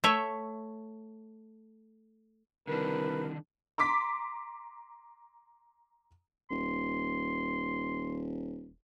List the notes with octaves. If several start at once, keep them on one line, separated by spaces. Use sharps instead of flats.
A3 C#5 E5
C2 D3 D#3 D4 A#4 B4
A#5 C6 D6 B6
D#1 C6